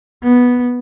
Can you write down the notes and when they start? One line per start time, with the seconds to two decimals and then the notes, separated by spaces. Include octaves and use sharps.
0.24 B3